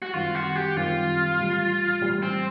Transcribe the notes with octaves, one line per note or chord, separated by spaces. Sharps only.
F#4
F#2 D#3 G3 C4 F4
F#4
G4
F#2 D#3 G3 C4 F4
A2 E3 G3
A2 E3 G3
C4